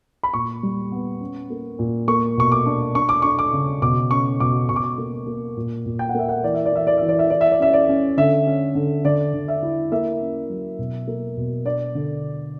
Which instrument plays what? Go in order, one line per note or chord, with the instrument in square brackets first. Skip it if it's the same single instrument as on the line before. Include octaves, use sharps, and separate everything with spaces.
[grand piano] B5
A#2 C#6
G3
B3
C#4
A#3
A#2
A#3 C#6
B2 C#6
D6
D4
D4 C#6
D6
D4 C#6
D6
C#3
B2 D6
C#4 C#6
B2 D6
B2 C#6
D6
C#6
A#3
A#3
A#2
A#2
G5
F#5
A#3 E5
F#5
E3 D5
E5
D5
E3 E5
D5
E3 E5
D5
E5
E3 D5
E5
D5
C#4 E5
D5
C#4
D3 E5
C#4
D3
D3 D5
D3
E5
E4
A#3 E5
C#4
F#3
B2
A#3
B2
D4 D5
D3